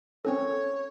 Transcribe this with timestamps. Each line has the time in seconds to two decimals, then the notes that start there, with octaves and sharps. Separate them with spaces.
0.25 C4 C#4 A4 C#5